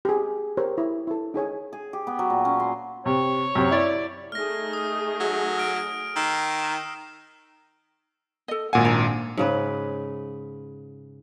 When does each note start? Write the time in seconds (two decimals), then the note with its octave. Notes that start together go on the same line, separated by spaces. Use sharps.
0.05 G4 G#4
0.57 G4 A#4 C5 C#5
0.78 E4
1.07 E4 A4
1.34 D#4 G#4 C#5 G#5
1.73 G#4
1.93 G4
2.07 B3
2.19 F#3
2.30 A#2
2.45 C#4
2.60 C6
3.06 C3 C#5
3.55 F#2 C3
3.71 E4 D5
4.32 A3 D#4 G#4 F6 A#6
4.73 D#6 F6
5.20 F#3
5.58 F6 D7
6.16 D#3 E6 C7 E7
8.48 A4 D#5
8.73 G#1 A#2 F#4 F#5 G#5
8.85 D4 A#5
9.37 G#2 C#3 B4